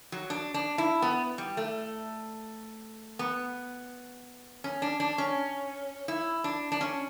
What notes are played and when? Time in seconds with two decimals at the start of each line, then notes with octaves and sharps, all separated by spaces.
0.12 F#3
0.30 D4
0.54 D4
0.78 E4
1.02 B3
1.38 G3
1.57 A3
3.19 B3
4.64 C#4
4.82 D4
5.00 D4
5.18 C#4
6.08 E4
6.44 D4
6.72 D4
6.81 C#4